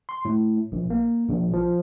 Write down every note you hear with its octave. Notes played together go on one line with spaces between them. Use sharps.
C6
A2
A#1
A#3
A#1
F3